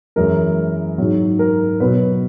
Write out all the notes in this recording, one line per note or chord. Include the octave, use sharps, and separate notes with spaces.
F#2 E3 G#3 A#4
G#2 F#3
A#4
B2 F#3 B4